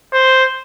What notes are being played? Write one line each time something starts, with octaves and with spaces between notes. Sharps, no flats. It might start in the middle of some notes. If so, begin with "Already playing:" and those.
C5